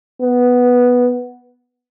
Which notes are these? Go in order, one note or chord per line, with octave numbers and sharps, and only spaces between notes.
B3